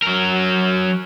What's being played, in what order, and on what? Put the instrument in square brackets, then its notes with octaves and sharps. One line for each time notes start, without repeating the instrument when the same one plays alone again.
[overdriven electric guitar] F#3 A#4